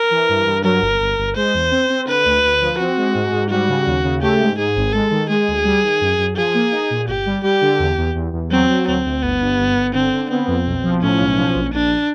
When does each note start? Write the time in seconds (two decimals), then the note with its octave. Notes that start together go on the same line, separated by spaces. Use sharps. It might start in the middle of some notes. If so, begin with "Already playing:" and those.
Already playing: A#4
0.11 E3
0.29 G2
0.46 G2
0.64 F#3 A#4
0.82 G1
1.00 G1
1.18 G1
1.36 G#3 C5
1.54 E2
1.71 C4
1.90 C4
2.07 D3 B4
2.25 D2
2.43 D2
2.61 F3
2.78 C4 F#4
2.97 G#3
3.15 G#2
3.32 G#2
3.50 G3 F#4
3.68 C#3
3.86 D#2
4.04 C#3
4.22 A3 G4
4.39 G#2
4.58 G#2 G#4
4.76 G#1
4.93 G#3 A4
5.11 D#3
5.29 G#3 G#4
5.48 D2
5.65 G3
5.83 D#3
6.01 F#2
6.18 F#2
6.36 F3 G#4
6.54 A#3
6.72 D#4
6.90 A#2
7.08 G1 G4
7.26 G3
7.43 G3 G4
7.61 D3
7.79 E2
7.98 E2
8.15 E2
8.33 E2
8.51 F#3 C4
8.70 F#3
8.87 D2 C4
9.05 D2
9.23 G1 B3
9.41 G2
9.59 G1
9.76 G1
9.94 D3 C4
10.13 D3
10.30 B3 C4
10.47 F2
10.66 B1
10.84 F3
11.02 A2 C#4
11.20 B1
11.37 F3
11.55 A#1
11.73 A#1 D4